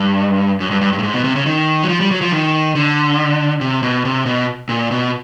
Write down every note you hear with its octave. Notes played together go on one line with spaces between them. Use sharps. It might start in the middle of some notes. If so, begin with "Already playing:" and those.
Already playing: G2
F#2
G2
G2
G2
A2
G#2
B2
C3
C#3
D#3
F#3
F3
G3
F#3
F3
D#3
D3
C3
B2
C3
B2
A#2
B2